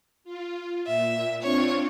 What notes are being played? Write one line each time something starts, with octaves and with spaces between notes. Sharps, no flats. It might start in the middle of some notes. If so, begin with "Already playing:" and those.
F4
A#2 E5
C4 D4 F4 C#5